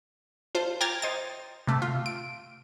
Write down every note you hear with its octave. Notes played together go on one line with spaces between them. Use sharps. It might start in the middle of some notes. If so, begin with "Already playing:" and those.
F4 C5 A5
G5 A#5 D6 F6 G#6 A6
C5 D#5 A6
C3 A3
F4
D7